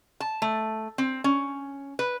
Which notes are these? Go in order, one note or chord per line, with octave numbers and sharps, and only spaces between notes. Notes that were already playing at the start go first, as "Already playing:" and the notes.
A5
A3
C4
C#4
B4